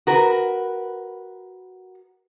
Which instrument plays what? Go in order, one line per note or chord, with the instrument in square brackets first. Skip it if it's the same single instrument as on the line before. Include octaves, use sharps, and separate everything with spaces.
[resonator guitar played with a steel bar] F#4 A#4 B4